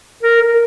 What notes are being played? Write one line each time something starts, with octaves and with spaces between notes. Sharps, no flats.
A#4
A#4